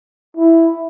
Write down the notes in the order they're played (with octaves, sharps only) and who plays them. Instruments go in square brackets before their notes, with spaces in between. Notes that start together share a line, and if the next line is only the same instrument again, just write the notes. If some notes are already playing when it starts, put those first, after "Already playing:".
[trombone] E4